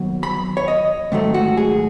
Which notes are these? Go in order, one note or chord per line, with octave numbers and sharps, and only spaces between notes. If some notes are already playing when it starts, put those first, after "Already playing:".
Already playing: D#2 F#3 B3
B5
C#5
D#5
G#2 D#3 F#3 A3
F#4
G#4